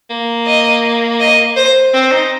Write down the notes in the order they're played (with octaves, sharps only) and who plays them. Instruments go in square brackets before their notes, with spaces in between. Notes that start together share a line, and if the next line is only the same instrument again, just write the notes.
[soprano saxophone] A#3
[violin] D#5
D#5
C5
[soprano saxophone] C4 [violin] C5
[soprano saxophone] D#4